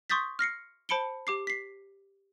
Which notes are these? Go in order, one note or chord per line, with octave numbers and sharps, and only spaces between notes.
C6 C#6 D#6 G6 A6 B6
F6 A#6 C7 C#7
C5 A5 B5 C#7 D7 G7
G4 D6 C7
B6 C7